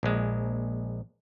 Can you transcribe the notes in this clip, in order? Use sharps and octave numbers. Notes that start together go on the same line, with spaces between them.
A#1 G#3